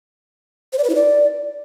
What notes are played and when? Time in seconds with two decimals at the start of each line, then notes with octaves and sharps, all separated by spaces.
0.73 C5
0.78 D5
0.84 B4
0.90 E4
0.95 D5